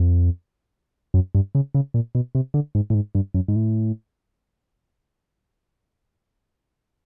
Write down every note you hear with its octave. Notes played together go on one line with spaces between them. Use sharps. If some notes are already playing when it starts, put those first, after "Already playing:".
Already playing: F2
F#2
G2
C#3
C#3
A#2
B2
C3
D3
G#2
A2
G#2
G2
F#2
G#2
A2